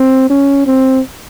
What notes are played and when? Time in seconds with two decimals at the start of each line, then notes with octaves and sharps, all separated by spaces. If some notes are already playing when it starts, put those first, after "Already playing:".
Already playing: C4
0.30 C#4
0.67 C4